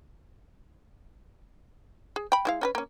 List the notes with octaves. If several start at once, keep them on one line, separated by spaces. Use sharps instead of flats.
G#4
G5 B5
G#3 E4 F5
C#4 A#4 B4
A#3 C#4